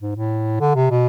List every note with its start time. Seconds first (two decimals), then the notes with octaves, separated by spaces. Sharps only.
0.01 G#2
0.16 A2
0.61 D3
0.75 C3
0.90 B2